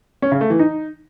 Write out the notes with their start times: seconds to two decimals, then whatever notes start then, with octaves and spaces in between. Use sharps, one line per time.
0.22 C#4
0.32 C#3
0.41 A3
0.50 E3
0.59 D#4